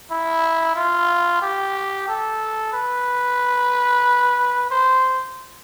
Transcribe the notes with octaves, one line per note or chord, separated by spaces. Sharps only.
E4
F4
G4
A4
B4
C5